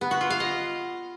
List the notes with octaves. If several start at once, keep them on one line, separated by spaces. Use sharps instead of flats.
B3
F#4
F4
F5
D#5